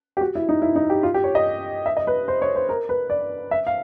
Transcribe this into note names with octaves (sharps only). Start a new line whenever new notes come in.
G4
F#4
E4
D#4
E4
D#4
G4
F4
G4
C#5
D#5
E5
D#5
B4
C5
C#5
C5
A#4
B4
D5
E5
F5